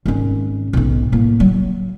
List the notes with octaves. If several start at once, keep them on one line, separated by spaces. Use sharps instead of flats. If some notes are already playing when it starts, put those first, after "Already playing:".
G#1 C#4
B1 G#2
A2 A#3
F#3